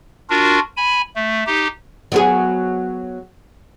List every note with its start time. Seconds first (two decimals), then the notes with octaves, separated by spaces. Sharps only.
0.30 D4 F4 F#4 A#4
0.77 G#5 B5
1.16 A3
1.47 D#4 G4
2.12 F#3 B3 G#4